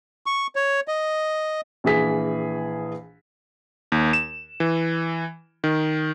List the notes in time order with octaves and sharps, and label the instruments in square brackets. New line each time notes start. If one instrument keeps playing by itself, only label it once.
[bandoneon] C#6
C#5
D#5
[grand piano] A#1 E3 G#4 B6
[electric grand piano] D#2
E7
E3
D#3